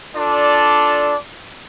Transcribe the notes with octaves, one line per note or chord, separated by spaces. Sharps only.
D4 F4 A4 D5